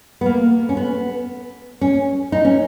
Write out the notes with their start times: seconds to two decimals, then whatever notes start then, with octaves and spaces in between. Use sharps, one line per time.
0.21 B3
0.26 A#3
0.69 C#4
0.77 B3
1.81 C#4
2.32 D#4
2.45 C#4